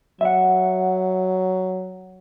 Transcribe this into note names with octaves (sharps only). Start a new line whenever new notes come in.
F#3 E5 F#5